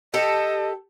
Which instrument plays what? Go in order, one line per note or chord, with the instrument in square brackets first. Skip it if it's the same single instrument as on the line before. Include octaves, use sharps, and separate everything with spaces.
[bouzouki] G4 A4 [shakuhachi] D#5